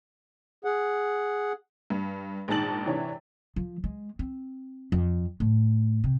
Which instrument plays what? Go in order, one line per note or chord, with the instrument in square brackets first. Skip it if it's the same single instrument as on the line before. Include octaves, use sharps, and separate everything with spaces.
[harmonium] G#4 F#5
[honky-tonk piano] G2
A#1 G#2 D#3 A5 A6 F#7
C3 E3 D4 C#5
[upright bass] F3
G#3
C4
F2
A2
C3